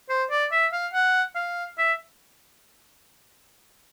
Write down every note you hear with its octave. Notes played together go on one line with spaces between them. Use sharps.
C5
D5
E5
F5
F#5
F5
E5